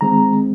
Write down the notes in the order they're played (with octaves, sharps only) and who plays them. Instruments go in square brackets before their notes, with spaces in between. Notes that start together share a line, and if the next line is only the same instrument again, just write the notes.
[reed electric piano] D#3 G#3 C4 A#5